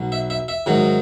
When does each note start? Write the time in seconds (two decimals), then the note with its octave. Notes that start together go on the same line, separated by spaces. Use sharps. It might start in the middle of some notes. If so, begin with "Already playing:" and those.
Already playing: B1 B2 F#3
0.12 E5
0.30 E5
0.48 E5
0.66 G#2 D#3 F#3